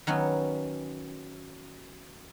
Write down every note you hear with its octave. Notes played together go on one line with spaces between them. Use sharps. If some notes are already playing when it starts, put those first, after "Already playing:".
D#3 F#3 B3 C#4